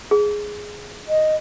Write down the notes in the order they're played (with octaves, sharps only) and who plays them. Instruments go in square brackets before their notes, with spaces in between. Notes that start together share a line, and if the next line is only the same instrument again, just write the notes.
[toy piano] G#4
[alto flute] D#5